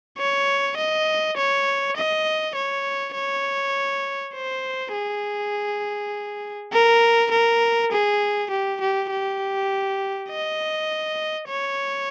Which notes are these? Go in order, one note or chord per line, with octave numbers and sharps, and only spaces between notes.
C#5
D#5
C#5
D#5
C#5
C#5
C5
G#4
A#4
A#4
G#4
G4
G4
G4
D#5
C#5